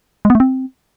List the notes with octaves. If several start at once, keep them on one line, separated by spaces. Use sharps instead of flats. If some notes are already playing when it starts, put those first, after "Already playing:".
G#3
B3
A3
C4